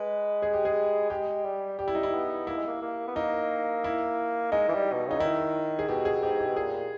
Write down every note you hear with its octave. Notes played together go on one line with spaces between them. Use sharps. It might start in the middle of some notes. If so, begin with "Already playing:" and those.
Already playing: G#3 B4
G#4
G4
G#4
G#3 G4
G3
G3 G4
E4
D#4
E4
B3
A#3 E4
G#3
A#3
A#3
B3
A#3 D#4
E4
G#3 D#4
E3
G3
B2
C#3 D#4
D#3 E4
G#4
B2 G4
G#4
G#2 G4
G4
B2
A#2 G#4